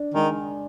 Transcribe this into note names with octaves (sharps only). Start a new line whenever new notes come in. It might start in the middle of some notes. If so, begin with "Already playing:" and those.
Already playing: D4
D#3 G#3